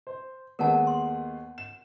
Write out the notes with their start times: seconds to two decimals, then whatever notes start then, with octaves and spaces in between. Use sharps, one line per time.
0.07 C5
0.59 D#2 G#3 B3 A#4 F#5 A5
0.87 C6
1.58 E7